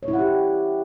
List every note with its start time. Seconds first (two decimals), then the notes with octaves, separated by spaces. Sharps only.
0.03 C#5
0.08 E4
0.13 F#5
0.19 G4